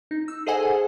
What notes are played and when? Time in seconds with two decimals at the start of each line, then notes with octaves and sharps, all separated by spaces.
0.11 D#4
0.28 E6
0.46 G#4 A4 C5 D#5 F#5 G#5